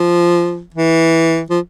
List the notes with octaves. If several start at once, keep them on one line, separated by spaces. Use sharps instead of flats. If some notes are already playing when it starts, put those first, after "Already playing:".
Already playing: F3
E3
F3